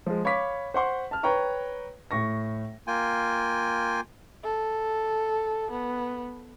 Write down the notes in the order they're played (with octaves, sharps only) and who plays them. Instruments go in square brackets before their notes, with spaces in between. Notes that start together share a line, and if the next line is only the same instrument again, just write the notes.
[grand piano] F3 G#3
C#5 F5 B5 C#6 D6 B6
C5 F#5 C6 C#6
A5 F6
B4 C#5 G5 A#5 C#6
A2 C#6 A#6
[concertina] A#3 F4 G5 G#5
[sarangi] A4
B3